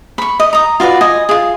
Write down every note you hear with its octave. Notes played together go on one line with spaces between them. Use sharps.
B5 C#6
D#5
A#5 D#6
F4 F#4 B4 D5
D#5 G#5
F4 G#4